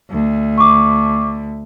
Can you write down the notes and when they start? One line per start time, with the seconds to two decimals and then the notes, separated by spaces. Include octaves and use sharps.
0.10 D2
0.58 C#6 D6